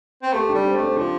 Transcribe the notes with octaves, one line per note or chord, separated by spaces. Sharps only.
C4
A3 G4
G3 D4
C4
A3
C4
F3 D4